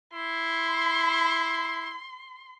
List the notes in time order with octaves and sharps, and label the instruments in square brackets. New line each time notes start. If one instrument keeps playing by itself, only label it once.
[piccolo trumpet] E4 [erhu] C6